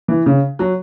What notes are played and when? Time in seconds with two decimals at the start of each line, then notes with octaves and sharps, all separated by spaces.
0.08 E3
0.26 C#3
0.59 F#3